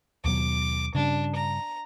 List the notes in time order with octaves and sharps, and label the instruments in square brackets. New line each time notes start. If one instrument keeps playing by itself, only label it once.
[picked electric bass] D#2 B2 F#3 [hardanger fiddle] D6
[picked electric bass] G2 C#3 [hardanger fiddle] D4
[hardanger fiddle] A#5